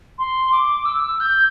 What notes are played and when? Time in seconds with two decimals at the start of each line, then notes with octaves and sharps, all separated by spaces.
0.18 C6
0.52 D6
0.85 E6
1.20 G6